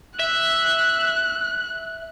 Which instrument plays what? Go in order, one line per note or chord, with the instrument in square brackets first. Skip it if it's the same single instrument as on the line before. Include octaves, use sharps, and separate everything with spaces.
[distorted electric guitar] E5 [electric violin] F#6